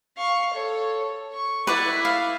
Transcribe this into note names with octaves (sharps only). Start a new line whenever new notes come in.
F5 C#6
A4 C#5
C#6
E4 B4 D5 F#5
F5